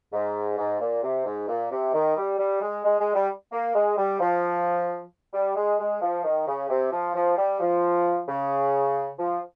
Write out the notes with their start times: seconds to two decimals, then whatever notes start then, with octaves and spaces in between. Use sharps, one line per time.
0.13 G#2
0.58 G#2
0.80 A#2
1.03 C3
1.26 G#2
1.48 A#2
1.71 C3
1.94 D#3
2.17 G3
2.39 G3
2.62 G#3
2.84 G#3
3.00 G#3
3.15 G3
3.52 A#3
3.75 G#3
3.98 G3
4.20 F3
5.34 G3
5.56 G#3
5.80 G#3
6.02 F3
6.24 D#3
6.47 C#3
6.69 C3
6.92 F3
7.15 F3
7.37 G3
7.60 F3
8.28 C#3
9.19 F3